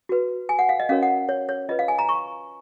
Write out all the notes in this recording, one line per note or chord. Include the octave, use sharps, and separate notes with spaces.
F#4 B4
G#5
F#5
F5
D#5
C#4 F#4 A#4 C#5 F5
F#5
C#5
C#5
F4 B4 D#5
F5
G#5
A#5
C#6